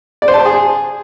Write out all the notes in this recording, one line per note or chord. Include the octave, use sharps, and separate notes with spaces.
D5
C5
A5
C6
G#4